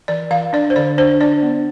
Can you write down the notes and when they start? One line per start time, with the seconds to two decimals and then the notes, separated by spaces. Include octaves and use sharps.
0.08 E3 D5
0.31 E3 F5
0.53 D4 D5
0.70 C5
0.76 D3 D5
0.98 D4 C5
1.21 D4 D5
1.42 B3